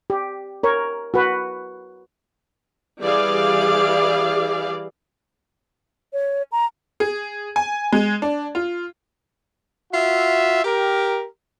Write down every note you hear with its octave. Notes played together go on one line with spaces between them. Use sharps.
G4
A#4 C#5
F#4 B4
E3 G3 G#4 D5 F5
C#5
A#5
G#4
G#5
G#3
D4
F4
F4 F#4 E5
G4 A#4